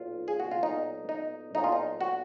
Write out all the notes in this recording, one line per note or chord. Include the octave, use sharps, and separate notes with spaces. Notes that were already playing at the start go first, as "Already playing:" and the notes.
Already playing: B1 A#2 F#3 F4
G#4
F#4
F4
B1 A#2 F#3 D#4
D#4
B1 A#2 F#3 D#4
F4
D#4
F#4